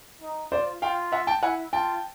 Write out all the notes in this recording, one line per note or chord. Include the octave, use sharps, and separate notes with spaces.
D#4
F4 C5 D5
F4 F5 G5
E5 F#5
G5 A5
E4 F#5 G#5
F4 G5 A5